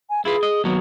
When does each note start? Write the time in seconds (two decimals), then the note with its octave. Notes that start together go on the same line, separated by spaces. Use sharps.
0.10 G#5
0.25 E4 F4 G#4 B4
0.43 D#5
0.64 D#2 F#3 B3